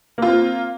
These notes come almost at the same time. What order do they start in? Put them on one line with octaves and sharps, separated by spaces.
A#3 F4 C4